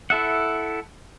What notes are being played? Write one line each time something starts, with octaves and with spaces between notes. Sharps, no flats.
E4 A4 E5 F#5